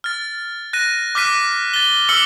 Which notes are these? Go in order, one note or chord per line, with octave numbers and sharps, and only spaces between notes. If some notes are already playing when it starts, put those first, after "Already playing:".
F6 A6
F#6 A#6 D#7
D6 F6 F#6 B6 D#7
A6 G7
D6 E6 F6 C#7 F#7 G7